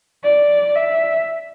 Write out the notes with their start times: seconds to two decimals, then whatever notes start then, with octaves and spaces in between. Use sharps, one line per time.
0.24 D5
0.76 E5